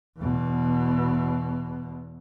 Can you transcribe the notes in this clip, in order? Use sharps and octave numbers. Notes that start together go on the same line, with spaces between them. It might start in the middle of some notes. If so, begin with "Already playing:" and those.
E2 B2